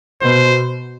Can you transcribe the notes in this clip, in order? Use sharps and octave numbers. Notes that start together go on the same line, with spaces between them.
B2 C5